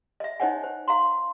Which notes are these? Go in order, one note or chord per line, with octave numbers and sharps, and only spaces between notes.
D#5 E5
D#4 C5 C#5 D#5 F#5 G#5
C5
F5 A#5 C6